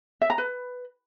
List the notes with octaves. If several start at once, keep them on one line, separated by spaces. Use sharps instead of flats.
E5
A#5
B4